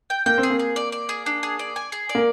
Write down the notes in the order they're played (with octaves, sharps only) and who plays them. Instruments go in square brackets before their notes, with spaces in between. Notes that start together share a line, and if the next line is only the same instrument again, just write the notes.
[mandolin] G5
[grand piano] A#3 [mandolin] G5
[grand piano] C4
[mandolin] G#4
[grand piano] A#3
[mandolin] G#4
D5
D5
G#4
D4
G#4
D5
G#5
G#4
D5
[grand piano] A#3